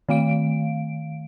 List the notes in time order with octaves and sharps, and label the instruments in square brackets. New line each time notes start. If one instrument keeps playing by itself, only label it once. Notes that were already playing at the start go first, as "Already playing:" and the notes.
[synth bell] D#3 A3 F5 D7